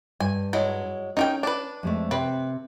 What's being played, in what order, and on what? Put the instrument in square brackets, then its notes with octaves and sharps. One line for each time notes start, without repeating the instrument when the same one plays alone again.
[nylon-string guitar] G2 [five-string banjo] G#5
[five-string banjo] F#3 G#3 E4
[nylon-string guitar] C#4 [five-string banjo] D#4 A#4 G5
[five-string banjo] D4 B4
[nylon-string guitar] F2 G#3 A3
[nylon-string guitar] C3 [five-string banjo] C4 B4